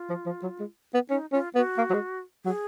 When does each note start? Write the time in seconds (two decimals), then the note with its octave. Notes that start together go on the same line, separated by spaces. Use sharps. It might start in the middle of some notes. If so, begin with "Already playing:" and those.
Already playing: F4
0.10 F3
0.26 F3
0.43 F#3
0.60 G#3
0.94 B3
1.10 C#4 D#4
1.32 C#4 F4
1.55 B3 F#4
1.78 A#3
1.90 F#3
1.94 G#3
2.45 F#3 G#4